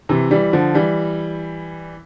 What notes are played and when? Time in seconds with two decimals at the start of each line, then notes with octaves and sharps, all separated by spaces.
0.09 C3 E3
0.31 E3 G3
0.53 D3 F3
0.75 E3 G3